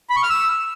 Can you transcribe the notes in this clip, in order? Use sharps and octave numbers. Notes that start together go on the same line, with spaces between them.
B5
C#6
F6
E6